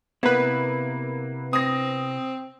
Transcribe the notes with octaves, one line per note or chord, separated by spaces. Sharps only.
C3 A#3 B3 E4 B4
C4 D#6 A#6